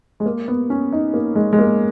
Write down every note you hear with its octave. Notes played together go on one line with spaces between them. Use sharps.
G#3
A#3
B3
C#4
D#4
A#3
G#3
G#3
A#3